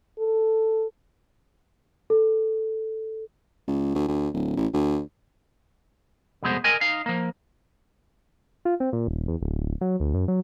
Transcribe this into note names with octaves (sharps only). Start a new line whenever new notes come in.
A4
A4
C#2
D2
D2
D1
A1
D2
C2 F2 B2 G#3 B3 C5
A#4 D#5 G#5
D#4 F5
F3 A#3
F4
C4
A#2
D#1
E2
D1
F#3
D2
F#2
F#3